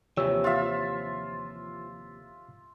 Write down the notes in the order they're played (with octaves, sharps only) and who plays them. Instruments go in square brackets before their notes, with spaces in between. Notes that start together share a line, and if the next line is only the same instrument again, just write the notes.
[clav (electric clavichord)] D#2 C3 E3 [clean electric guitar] F3 [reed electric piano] G4 C#5 E6
[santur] F4 E5